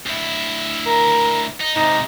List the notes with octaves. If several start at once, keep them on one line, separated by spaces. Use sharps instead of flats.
D2 E4
A#4
D#4
G#2 C3 D#4